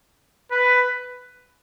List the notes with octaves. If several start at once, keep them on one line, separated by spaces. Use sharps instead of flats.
B4